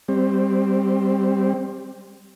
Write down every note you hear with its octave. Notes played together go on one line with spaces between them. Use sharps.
G3 C4